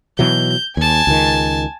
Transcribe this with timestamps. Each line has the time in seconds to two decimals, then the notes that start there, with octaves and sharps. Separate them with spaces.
0.19 B2 E3 F#3 G6
0.77 D#2 G#5 A5
1.07 C#2 D#3